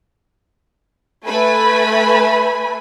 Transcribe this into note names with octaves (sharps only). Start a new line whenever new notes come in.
A3 B4 G#5 B5